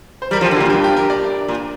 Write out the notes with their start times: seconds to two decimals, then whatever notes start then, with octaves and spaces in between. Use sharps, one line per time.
0.22 C5
0.31 G3 A#4
0.41 F3
0.44 G4
0.51 D3
0.57 A#2 F4
0.70 G2 G4
0.84 G4
0.97 A#4
1.10 D5
1.48 A#2